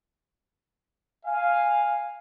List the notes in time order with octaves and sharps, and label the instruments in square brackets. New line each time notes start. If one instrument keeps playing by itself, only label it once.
[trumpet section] F5 [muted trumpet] G#5